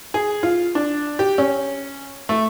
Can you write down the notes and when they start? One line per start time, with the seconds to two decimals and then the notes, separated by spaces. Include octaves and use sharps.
0.14 G#4
0.43 F4
0.75 D4
1.19 G4
1.38 C#4
2.29 A3